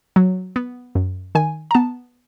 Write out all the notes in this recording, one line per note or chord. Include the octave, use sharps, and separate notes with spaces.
F#3
B3
F#2
D#3 G#5
A#5
B3 A5